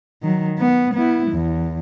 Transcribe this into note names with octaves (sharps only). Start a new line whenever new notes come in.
D#3 F#3
B3
B3 E4
E2